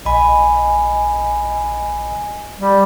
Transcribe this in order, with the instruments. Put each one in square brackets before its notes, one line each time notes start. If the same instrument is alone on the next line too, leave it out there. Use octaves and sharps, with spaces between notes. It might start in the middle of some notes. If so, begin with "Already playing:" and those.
[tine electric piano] A#1 B5 [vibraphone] D#5 G#5
[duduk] G3